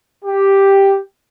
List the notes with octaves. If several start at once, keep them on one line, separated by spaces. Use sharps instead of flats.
G4